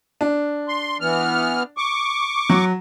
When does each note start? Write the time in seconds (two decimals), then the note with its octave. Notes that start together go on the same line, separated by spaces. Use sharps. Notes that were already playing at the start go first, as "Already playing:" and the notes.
0.21 D4
0.68 C6
1.01 E3 B3 F6
1.77 C#6 D6
2.50 F#3